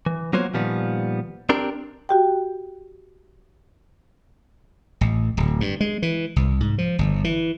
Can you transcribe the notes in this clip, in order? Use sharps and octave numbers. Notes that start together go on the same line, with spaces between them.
E3
F#3 A#3 B3 F4 C5 C#5
A#2 D#3 F3 G3 B3
C4 D4 G4 A#4
F#4 G4 G5
A1
D1
G2
G#3
E3
C2
G#2
F3
G1
E3